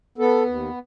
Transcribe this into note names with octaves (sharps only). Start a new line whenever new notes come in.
B3 A4
D#2